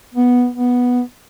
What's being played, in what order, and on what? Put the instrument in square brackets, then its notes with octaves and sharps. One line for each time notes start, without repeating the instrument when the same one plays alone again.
[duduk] B3
B3